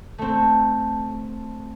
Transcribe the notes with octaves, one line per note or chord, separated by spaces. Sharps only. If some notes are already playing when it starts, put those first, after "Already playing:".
A3 C4